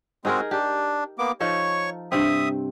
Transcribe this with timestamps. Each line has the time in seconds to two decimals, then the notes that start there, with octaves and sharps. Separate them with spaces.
0.25 G#3 C4 D#4 F#4 G#4 A#4
0.51 D4 G4
1.19 A#3 B3 D6
1.40 F3 D#4 A4 C#5 C#6
2.12 G2 C3 C4 E5 D#6